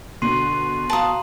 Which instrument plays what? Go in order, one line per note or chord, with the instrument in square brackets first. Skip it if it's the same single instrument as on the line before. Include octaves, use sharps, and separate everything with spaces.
[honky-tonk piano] B2 [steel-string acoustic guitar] D3 [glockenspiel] C6 C7 D#7
[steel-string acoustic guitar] F#4 F5 [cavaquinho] A5 D#6 [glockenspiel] A#5 F#7